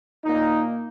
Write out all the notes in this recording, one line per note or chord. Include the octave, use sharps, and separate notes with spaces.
A#2 A#3 D#4